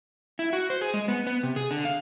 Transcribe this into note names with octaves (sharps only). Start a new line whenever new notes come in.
E4
F#4
C5
G#4
G#3
B3
B3
C3
G#4
D3
F5